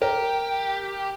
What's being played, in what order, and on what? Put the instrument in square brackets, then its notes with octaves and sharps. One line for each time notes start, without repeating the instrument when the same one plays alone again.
[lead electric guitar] G4 [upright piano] A#4